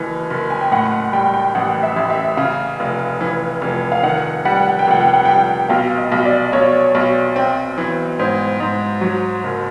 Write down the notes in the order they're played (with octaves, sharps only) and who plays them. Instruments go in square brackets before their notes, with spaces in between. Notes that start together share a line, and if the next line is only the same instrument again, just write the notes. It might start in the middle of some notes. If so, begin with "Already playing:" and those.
Already playing: [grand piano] F#1 E3
F#1
[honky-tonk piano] G#5
G5
[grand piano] A2 [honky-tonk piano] F#5
[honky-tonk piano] F#5
[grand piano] G3 [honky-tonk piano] G5
[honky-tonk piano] G5
[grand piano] A1 [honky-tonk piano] F#5
[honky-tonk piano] E5
[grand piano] A1
[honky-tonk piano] E5
[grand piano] C#3 [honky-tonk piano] F5
[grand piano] F1
E3
F1
[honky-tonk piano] F5
[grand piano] D#3 [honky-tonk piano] F#5
[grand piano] G3 [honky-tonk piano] F#5
[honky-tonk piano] G5
F#5
G5
[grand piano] F1 [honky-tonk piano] F#5
[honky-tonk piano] G5
F#5
[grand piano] G3 [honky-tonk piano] G5
[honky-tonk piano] F#5
[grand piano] B1 [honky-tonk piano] F5
[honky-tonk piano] D#5
[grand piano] B1
[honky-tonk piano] D5
[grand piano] B1 [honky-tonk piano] C#5
[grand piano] B1
C4
E3
[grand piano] G#2 [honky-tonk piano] C5
[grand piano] G#2
F#3
F#1